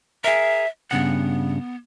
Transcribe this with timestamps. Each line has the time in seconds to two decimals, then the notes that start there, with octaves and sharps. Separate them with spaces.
0.24 G#4 A#4 E5
0.91 G2 C#3 B3 F#5